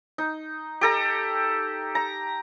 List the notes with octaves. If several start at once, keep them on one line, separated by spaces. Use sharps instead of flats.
D#4
G4 A4 A#5
A#5